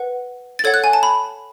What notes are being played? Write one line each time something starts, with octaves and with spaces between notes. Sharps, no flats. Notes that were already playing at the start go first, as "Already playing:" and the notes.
Already playing: B4 F#5
A6
A4 C#5 F#5 G#6
F#6
G#5
A5
B5